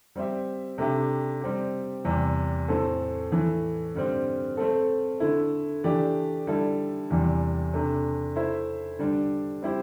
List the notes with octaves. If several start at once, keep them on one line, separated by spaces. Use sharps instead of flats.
G3 C4 G4 E5
C3 A3 D4 G4 E5
G3 C4 G4
E2 C3 G3
A2 A3 C4 A4 C5
A2 E3 A3
G2 D3 G3 C4
A3 C4 A4
D3 A3 E4
E3 A3 D4 G4 D5
D3 G3 E4 A4
E2 C3 E3 G3
C3 A3 D4
A3 E4 C5 E5
D3 G3 D4
G3 C4 E4 G4 C5